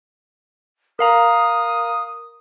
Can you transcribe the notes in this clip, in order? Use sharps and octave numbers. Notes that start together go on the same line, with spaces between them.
A#4 F5 A#5 D#6